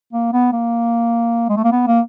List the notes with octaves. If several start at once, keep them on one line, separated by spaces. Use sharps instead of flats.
A#3
B3
A#3
G#3
A3
A#3
B3
A#3